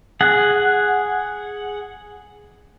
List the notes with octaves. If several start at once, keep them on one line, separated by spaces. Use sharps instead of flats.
G#4 F#5